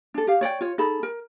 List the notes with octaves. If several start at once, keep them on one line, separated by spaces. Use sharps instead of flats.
D4 A4
G4 F5
C#5 D5 E5 G5
F4 C#5
D#4 G#4 A4 B5
A#4